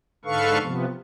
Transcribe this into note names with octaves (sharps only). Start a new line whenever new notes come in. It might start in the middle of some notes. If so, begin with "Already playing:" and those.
G#2 D3 A4 B4 F5 C#6
C3 F3 B3